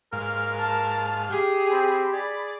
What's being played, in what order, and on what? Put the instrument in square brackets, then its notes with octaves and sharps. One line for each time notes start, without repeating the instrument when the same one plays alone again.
[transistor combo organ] G#2 F5 [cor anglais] A#4
[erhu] A5
[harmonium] G4 [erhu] G#4
[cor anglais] C4 [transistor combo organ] B5
[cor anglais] G#4 [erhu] D5